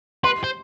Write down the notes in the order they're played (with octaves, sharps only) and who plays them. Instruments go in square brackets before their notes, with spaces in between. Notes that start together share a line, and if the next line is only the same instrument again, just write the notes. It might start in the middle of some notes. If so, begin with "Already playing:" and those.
[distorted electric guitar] B4 [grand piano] C6
[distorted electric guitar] C5